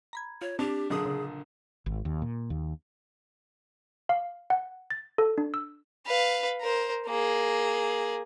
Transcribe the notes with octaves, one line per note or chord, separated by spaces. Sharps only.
A#5 B5 G#6
F4 C#5
C4 D4 G4
A#1 D3 F#3 G#4 D#6
C#3
G#1
D#2
A#2
D#2
F5
F#5
A6
A4
D4
E6
B4 F5
A#4 C5
A#3 G#4